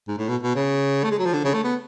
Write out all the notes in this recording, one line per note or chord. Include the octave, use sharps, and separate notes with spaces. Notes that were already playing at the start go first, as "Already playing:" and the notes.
G#2
A2
B2
B2
C#3
A3
G#3
F#3
F3
D3
C#3
A3
B3